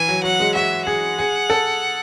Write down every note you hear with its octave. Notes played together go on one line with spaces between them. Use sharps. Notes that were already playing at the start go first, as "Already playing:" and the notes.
Already playing: E3 G#5
F#3
F#3 F#5
G#3
F#4 E5
G#4 F#5
G#4
A4